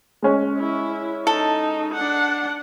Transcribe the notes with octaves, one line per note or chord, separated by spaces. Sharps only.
G#3 C#4
E4
D#4 A4
D4 F#5